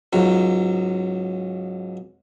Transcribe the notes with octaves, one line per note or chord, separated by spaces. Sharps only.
C#2 G#2 F#3